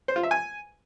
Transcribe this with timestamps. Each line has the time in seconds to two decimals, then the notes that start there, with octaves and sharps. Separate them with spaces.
0.08 C5
0.16 F4
0.23 E5
0.31 G#5